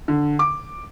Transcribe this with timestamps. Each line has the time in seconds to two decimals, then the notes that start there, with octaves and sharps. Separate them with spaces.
0.08 D3
0.39 D6